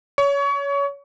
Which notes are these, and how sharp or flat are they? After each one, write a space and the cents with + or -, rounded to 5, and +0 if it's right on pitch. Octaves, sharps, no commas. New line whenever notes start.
C#5 +25 C#6 +25